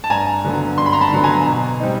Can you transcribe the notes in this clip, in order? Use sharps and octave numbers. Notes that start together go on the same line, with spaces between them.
A5
G2 G#5 A#5
D3 F#3 B3
G2 C6
B5
A#5 C6
A5 B5
D3 F#3 B3
G#5 A#5
B2
G3 C4 D#4